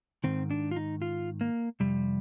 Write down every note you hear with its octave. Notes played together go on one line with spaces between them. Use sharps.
G#2 D#3 C4
D4
F4
D#4
F4
A#3
F2 C3 G3